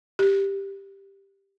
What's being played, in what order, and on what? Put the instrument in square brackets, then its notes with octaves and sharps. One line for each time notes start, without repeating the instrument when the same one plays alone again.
[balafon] G4